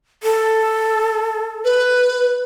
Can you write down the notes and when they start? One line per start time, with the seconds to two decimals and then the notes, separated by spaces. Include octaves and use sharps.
0.23 A4
1.65 B4